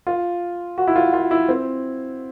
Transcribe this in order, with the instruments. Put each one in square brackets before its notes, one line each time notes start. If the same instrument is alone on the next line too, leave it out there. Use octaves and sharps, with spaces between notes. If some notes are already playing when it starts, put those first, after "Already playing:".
[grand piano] F4
F#4
E4
F4
F4
E4
C4